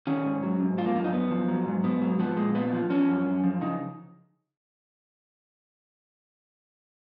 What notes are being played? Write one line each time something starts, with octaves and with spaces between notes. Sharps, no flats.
D#3 C#4
G#2
F#3
G#2
F3 F4
A#3
F#2 F4
D#4
F#2 B3
F3
F#3
G#2
G#2 B3
F#3
F3 B3
A#2 G#3
A#2 B3
F3
F3 C#4
F#2
F#2
F3
C#3 D#4